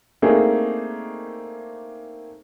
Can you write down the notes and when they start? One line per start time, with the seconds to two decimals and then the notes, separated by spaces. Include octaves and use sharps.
0.22 A3 A#3 C4 D4 D#4 G#4